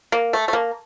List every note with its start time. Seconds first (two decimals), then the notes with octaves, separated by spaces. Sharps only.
0.12 A#3
0.33 A3
0.48 A3
0.53 A#3